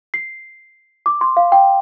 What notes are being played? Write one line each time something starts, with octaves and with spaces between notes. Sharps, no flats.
C7
D6
C6
F5
G5